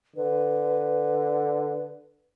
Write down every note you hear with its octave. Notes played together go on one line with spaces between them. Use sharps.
D3 B4